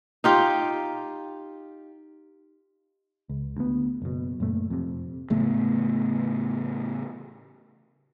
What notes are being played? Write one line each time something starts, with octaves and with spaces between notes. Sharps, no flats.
D#4 F4 G4
C#2
D2 B3
F#1 B2
F#1 F#2 A#2 A3
F2 C3
A2 C#3 A3 B3